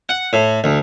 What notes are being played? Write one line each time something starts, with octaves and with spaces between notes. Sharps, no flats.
F#5
A2
D2